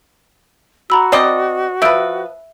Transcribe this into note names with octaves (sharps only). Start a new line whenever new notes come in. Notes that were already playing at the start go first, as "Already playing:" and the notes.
F#4 A#5 B5 E6
C4 D5 D#5
F3 B4 E5 E6 D7